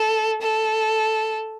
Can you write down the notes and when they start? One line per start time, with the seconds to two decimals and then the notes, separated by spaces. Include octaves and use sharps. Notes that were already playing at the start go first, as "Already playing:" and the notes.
Already playing: A4
0.41 A4